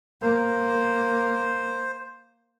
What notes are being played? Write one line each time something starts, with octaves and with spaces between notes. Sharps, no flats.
A#3 C5